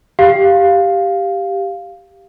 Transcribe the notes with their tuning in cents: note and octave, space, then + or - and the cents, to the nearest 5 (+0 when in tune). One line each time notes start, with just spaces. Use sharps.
G4 +0 F5 +0